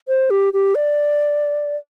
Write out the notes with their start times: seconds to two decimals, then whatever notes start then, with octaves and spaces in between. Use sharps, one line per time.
0.08 C5
0.30 G4
0.53 G4
0.75 D5